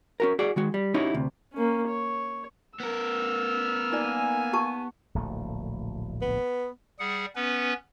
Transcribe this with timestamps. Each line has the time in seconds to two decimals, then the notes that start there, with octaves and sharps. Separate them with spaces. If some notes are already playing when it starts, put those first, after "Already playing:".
0.20 C#4 F#4 A#4
0.39 F#4 G#4 D5 F#5
0.56 D#3 G#3 F#4
0.74 G3
0.94 C#4 D#4 E4 F#4 G4 C#5
1.14 D2 C3
1.54 A#3 C#4
1.88 C#5
2.80 B3 A#4 E6 F6
3.92 A#3 D#4 D5 G#5
4.53 G4 A5 C#6
5.15 D1 A#1 A3
6.22 B3
7.00 G3 G#4 F#5
7.36 B3 C#4 B4